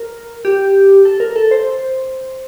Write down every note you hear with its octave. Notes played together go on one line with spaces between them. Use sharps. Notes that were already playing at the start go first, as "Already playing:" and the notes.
Already playing: A#4
G4
A4
A#4
A4
C5